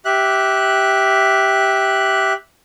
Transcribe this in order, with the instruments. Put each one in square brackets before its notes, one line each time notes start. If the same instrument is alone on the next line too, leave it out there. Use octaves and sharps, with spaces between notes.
[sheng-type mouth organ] G4 E5 F#6